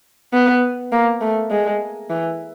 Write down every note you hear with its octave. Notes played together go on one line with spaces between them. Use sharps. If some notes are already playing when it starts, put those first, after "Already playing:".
B3
A#3
A3
G#3
E3